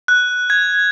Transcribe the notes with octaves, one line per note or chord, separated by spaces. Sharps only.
F#6
G#6